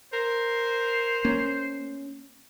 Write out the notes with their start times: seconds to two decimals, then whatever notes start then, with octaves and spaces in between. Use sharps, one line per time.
0.13 A#4 C5
1.25 A#3 C#4